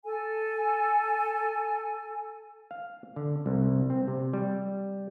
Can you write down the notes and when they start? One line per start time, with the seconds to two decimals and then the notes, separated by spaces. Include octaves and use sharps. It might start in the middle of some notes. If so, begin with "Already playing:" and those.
0.04 A4 G#5
2.71 F5
3.16 D3
3.46 C2
3.90 C4
4.08 C3
4.33 G3